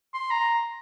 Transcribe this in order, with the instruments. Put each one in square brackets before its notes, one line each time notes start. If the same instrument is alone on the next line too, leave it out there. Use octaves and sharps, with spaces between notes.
[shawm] C6
A#5